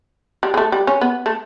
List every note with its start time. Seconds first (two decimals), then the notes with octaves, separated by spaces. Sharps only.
0.43 G3
0.54 G#3
0.57 A3
0.72 G3
0.87 C#4
1.01 B3
1.26 A3